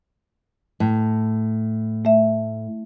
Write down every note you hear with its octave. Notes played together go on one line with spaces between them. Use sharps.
A2
A3 E5